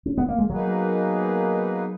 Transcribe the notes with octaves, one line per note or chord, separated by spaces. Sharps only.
C#4
B3
A#3
G#3
B2 F#3 A#3 D#4 G#4 B4